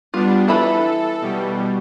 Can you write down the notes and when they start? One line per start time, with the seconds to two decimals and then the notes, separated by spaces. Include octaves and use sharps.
0.14 G3 B3 D4 F4
0.48 E3 E4 A4 B5
1.22 B2 G3